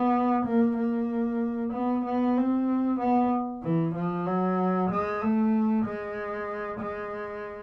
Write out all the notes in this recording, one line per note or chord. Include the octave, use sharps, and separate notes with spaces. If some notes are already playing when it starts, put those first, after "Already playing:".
Already playing: B3
A#3
A#3
B3
B3
C4
B3
E3
F3
F#3
G#3
A3
G#3
G#3